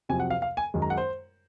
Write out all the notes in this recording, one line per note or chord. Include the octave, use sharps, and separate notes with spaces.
F2 C3 F#3 G#5
F#5
F5
F5
G#5
F#2 D#3 G#3
A#5
F#5
C5